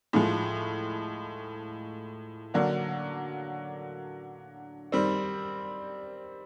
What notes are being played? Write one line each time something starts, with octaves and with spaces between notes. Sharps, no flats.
A2 F3 G#3
D3 F#3 A#3 D4
D#3 G3 C4